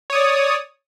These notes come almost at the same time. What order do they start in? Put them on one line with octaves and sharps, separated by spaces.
C#5 D#6 D5